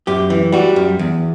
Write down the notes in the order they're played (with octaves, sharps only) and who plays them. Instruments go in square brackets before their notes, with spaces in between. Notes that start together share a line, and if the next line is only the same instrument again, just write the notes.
[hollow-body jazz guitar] F#2 G4
E3
G3 F#4
F#2
E2